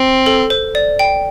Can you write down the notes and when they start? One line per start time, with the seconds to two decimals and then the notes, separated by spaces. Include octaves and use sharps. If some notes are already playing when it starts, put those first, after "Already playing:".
Already playing: C4
0.26 A4
0.50 C5
0.75 D5
0.99 G5